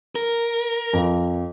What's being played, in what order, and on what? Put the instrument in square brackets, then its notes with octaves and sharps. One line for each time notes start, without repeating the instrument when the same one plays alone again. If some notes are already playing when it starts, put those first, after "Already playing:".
[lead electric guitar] A#4
[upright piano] F2 F4